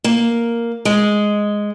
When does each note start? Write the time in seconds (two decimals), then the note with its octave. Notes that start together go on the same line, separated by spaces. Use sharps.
0.04 A#3
0.85 G#3